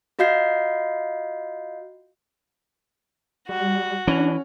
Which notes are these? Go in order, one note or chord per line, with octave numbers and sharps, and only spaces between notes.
F4 F#4 D#5 F5 G6 C7
G3 F#4
E3 C#4 D4 F7